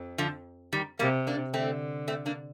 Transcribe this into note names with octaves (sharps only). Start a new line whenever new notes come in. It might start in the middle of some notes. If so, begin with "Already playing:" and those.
Already playing: F2
D3 F3
D#3 G3
C3 G3 A#3
A#3 D4
D3 A3 C4
A3 C4
A#3 D4